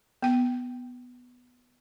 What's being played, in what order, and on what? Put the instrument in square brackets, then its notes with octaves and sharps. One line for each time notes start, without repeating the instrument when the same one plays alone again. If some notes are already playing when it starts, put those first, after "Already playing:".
[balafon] B3 G5